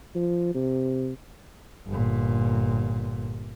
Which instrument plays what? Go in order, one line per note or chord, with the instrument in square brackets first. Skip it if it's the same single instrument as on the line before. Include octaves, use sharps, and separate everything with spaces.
[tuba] F3
C3
[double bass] G1 A#2